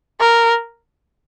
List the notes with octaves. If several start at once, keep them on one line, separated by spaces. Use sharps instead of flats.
A#4